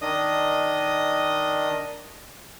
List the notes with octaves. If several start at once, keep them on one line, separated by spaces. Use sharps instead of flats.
D#3 D4 D#5 D#6